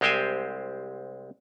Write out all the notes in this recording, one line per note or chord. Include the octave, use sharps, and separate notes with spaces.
C2 G#3 C4 G4 C5 G#5